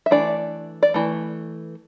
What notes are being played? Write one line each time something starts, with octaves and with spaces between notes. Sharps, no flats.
E5
E3 A3 D4 D5
D5
E3 A3